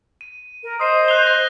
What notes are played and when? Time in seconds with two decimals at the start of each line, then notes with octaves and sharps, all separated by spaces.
0.21 D#7
0.64 A#4
0.80 C5 D#5 D#6 C7 D#7
1.08 F#6 F7 G7
1.27 A#6